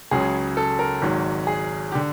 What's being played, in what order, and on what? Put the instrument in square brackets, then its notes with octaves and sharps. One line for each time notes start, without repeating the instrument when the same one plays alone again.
[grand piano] C#2 C#3 F#3 G#4
A4
A#4
G#1 G#2 D#3 F#3
G#4
G4
D3